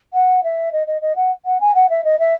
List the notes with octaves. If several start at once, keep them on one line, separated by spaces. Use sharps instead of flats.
F#5
E5
D#5
D#5
D#5
F#5
F#5
G#5
F#5
E5
D#5
E5